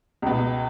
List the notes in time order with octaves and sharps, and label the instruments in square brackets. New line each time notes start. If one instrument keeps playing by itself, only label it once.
[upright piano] C#2 B2